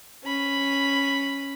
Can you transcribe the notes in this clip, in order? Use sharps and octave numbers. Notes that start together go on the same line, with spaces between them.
C#4 B5